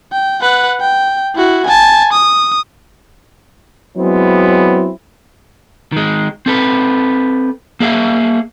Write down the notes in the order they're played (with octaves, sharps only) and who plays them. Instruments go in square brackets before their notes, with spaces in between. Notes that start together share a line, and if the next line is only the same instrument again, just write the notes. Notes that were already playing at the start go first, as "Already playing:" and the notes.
[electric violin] G5
B4 F#5
G5
E4 F#4
G#5 A5
D#6
[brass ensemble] F#3 G#3 B3 C4 E4
[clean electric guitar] D#3 G#3
C4 A4 B4
A#3 G#4 E5 F5